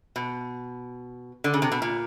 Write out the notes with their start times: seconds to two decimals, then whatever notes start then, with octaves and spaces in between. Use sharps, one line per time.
0.16 B2
1.44 D3
1.54 C#3
1.62 C3
1.72 B2
1.82 A#2